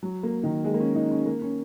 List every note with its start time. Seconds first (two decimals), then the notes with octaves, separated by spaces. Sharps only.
0.03 F#3
0.23 A#3
0.43 D#3
0.65 G#3
0.74 A#3
0.80 C#4
0.95 D#4
1.11 C#4
1.26 A#3
1.42 C#4